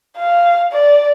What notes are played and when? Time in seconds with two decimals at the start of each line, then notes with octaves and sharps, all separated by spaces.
0.18 F5
0.72 D5